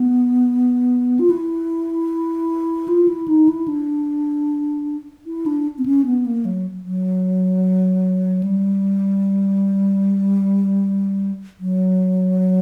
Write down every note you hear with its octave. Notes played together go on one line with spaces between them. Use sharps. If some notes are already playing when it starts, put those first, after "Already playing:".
Already playing: B3
F4
E4
F4
E4
D#4
E4
D4
E4
D4
C4
C#4
B3
A#3
F#3
F#3
G3
F#3